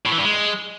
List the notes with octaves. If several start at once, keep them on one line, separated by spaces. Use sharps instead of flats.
A2
E3
G2
G#3